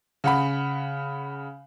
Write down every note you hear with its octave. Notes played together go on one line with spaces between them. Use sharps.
C#3 F#5 B5